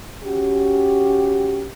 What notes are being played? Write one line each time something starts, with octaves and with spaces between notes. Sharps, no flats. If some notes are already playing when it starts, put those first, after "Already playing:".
C#4 F#4 G4